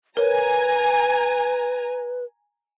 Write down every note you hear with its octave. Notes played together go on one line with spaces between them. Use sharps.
A#4 B4 C#5 G#5 A#5